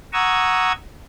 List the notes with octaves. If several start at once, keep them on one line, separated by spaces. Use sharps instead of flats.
F#5 A#5 C#6 D#6 E6 G#6